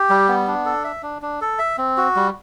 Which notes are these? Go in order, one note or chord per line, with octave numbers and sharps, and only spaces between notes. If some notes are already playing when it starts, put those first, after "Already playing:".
Already playing: G4
G3
B3
D4
A4
E5
D4
D4
A4
E5
C4
F#4
G3